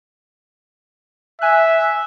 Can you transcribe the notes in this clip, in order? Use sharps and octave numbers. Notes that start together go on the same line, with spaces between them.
E5 G#5 F#6